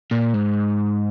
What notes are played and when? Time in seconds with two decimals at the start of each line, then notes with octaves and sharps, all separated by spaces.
0.11 A#2
0.34 G#2